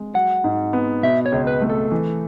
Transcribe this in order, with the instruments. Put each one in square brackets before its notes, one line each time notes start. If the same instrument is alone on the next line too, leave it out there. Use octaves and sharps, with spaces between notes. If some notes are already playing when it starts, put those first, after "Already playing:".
Already playing: [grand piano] G#3
[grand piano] F#3 [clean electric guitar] F#5
[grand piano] G#2
B3
[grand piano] B2 [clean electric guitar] E5
[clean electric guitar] C#5
[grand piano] C#2
[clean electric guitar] B4
[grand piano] A3
[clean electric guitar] A4
[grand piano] E3